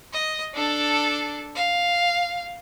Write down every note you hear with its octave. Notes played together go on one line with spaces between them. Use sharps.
D#5
D4 A4
F5